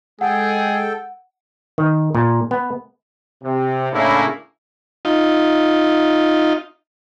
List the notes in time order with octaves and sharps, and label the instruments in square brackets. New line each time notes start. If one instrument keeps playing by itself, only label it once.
[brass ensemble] G#3 [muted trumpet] G#4 [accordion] A4 G5 [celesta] F#5
[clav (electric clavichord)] D#3
A#2
B3
[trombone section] C3
A2 C#3 A#3 D4 E4
[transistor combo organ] D#4 F4